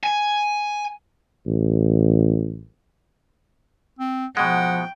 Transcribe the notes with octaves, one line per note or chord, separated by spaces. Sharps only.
G#5
A1
C4
B2 F3 G#3 F#5 G5